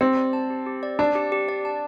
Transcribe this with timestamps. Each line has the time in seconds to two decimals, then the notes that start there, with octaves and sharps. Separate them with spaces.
0.01 C4 G4
0.17 D5
0.33 A5
0.50 G4
0.66 G4
0.83 D5
0.99 D4 A5
1.15 G4
1.32 G4
1.49 D5
1.65 A5